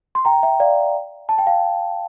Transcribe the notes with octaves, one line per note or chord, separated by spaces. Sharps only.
C6
G5 A#5
E5 G5
D5 F5
A5
G5
F5